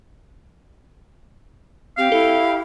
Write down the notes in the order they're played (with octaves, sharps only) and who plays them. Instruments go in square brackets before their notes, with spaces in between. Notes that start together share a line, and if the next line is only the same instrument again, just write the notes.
[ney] C4 [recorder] G4 [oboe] F5
[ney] E4 [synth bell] A4